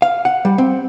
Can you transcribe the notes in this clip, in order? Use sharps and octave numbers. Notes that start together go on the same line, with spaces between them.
F5
F#5
G3
C4